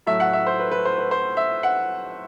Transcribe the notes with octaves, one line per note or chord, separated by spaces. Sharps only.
A2 F#3 A3 E5
F#5
E5
C5
B4
B4
C5
B4
C5
E5
F#5